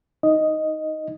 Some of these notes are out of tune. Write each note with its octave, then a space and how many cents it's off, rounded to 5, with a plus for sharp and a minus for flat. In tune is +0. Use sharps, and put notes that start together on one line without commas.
D#4 +10 D#5 +0